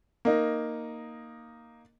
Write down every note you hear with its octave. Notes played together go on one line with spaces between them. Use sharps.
A#3 D#4